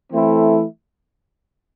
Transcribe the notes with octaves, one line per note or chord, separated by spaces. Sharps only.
E3 A3 C4 E4 A4